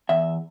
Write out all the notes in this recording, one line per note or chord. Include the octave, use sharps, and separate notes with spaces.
E2 E5